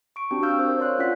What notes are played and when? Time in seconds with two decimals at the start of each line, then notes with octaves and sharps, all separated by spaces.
0.16 C#6 D7
0.31 C4 D4 F#4 G4
0.43 F5 E6 F6 G6
0.59 A#4 C5 E6
0.79 C#5 D5 F5 C6 F#6
0.99 C#4 F4 D5 F#5 B6